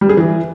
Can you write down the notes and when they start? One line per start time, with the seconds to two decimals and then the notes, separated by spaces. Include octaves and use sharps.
0.01 G3
0.09 G#4
0.17 E3